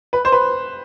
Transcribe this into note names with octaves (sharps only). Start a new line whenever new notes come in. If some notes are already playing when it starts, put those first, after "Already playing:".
B4
C5
B4